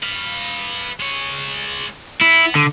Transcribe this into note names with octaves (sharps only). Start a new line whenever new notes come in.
B4 F5
G#3 C#5
B3 E4
D3